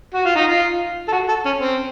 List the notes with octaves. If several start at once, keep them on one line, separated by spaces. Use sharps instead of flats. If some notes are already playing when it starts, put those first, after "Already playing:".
F#4
F4
D#4
F4
A4
F#4
A4
C#4
C4